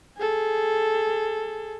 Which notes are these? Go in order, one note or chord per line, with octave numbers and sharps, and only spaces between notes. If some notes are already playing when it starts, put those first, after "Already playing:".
G#4 A4